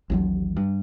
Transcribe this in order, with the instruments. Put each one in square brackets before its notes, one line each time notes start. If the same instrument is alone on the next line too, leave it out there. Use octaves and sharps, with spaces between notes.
[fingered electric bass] A1 D#2 F#3
G2